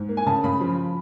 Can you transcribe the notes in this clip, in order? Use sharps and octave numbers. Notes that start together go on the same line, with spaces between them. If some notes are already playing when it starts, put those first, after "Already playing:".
Already playing: G#2
A#3
G#5
C#3 A5
C#3 B5
F3 B5